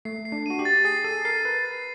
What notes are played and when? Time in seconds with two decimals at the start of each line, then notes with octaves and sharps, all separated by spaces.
0.05 A3 C7
0.25 C7
0.32 D4
0.46 F#4 D#7
0.59 G4
0.65 A6
0.85 G#4 C7
1.04 A4 D#7
1.25 A#4 C7
1.45 B4 C7
1.65 A6